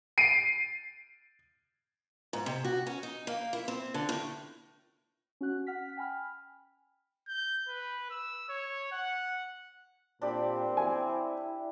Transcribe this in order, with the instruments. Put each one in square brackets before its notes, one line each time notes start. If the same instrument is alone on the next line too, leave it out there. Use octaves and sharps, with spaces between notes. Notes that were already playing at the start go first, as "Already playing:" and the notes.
[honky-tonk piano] C7 D7 D#7
[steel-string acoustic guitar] G#2
C3
F#4
C#4
D#4
A#3
E4
C4
D3
A2
[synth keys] C#4 F#4 F#6
F#5 F6 B6
G5 G#5 B5 F6
[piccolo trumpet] G6
B4
E6
C#5
F#5
[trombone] A#2 [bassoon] C4 [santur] D4 G4 B5
[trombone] E4 [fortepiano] G#5